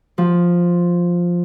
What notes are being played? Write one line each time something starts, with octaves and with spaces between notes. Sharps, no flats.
F3